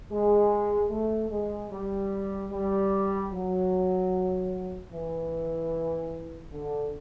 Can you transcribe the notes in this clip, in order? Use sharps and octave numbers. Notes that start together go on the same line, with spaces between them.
G#3
A3
G#3
G3
G3
F#3
E3
D3